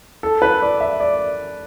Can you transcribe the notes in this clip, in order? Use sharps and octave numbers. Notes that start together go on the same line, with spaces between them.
A4
B4
D5
E5
D5